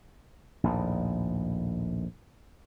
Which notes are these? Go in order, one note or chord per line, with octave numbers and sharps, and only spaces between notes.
A#1 D#2 A2